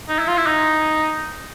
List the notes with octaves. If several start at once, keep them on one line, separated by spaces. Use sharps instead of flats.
D#4
E4
F4
E4
D#4